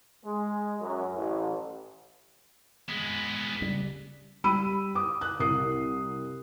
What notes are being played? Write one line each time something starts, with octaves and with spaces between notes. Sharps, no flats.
G#3
F#2
A1
G#3 B3
C#3 G3
G3 B5 E6 D#7
D6 D#6
F#6
C2 A#4 D#6 C7